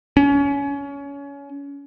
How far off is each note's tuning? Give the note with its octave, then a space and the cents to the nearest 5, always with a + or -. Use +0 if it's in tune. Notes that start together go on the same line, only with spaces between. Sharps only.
C#4 +25